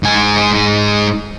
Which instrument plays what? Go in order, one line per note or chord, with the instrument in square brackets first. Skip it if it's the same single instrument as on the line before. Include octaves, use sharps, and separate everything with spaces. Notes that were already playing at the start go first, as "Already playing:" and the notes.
[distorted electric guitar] G#2 G#5